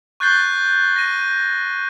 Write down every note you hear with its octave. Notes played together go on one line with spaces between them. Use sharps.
C#6 F#6 G6 A6 C7 G7
A#6 D#7